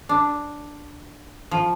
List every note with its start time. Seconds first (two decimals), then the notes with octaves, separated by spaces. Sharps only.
0.09 D4
1.51 F3